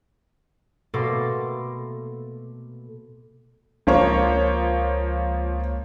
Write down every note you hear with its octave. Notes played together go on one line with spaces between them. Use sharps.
B2 A3 A#3 A4 C6 D6
C#2 F3 A#3 C#5